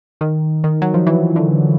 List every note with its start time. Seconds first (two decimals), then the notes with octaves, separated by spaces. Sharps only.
0.21 D#3
0.64 D#3
0.82 F#3
0.94 F3
1.07 E3
1.36 D3